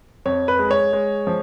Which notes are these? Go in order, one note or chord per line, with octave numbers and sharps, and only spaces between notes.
F2 C#5
B4
G#3
C#5
G#3
F3